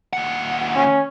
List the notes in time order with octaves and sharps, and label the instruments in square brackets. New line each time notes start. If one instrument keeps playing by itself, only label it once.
[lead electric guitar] D#2 F#5
[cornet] C#4